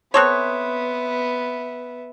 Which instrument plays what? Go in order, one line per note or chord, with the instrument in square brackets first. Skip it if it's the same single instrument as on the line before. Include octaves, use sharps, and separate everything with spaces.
[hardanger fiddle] B3 E5 [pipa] C4 A4 C#5 [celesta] C6 D#6 F#6